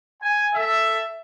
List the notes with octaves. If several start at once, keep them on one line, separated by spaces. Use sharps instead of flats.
G#5
A4 E5